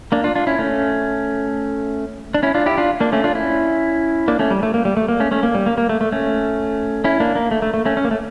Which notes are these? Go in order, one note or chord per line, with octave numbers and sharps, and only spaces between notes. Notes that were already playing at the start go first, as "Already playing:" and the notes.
A#3 D4
D4 F4
D4 F4
C#4 E4
A3 C#4
D4
C#4 E4
D4 F4
E4 G4
D4 F4
A#3 D4
A3 C#4
D4 F4
C#4 E4
A#3 D4
A3 C#4
G3
A3
A#3
G3
A3
A#3
A3 C#4
A3 C#4
A#3
G3
A#3
A#3
A3
A3
A3 C#4
C#4 E4
A#3 D4
A#3
A3
A3
A3
A3 C#4
C#4
A#3
A3